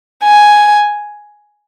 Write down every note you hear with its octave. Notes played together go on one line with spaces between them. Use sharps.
G#5